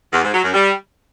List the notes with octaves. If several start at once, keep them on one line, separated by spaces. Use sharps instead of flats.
E2
G#2
F#3
F#2
G3